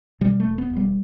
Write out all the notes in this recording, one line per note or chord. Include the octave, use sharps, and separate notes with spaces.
B2 G3
A3
E1
B3
E1
G3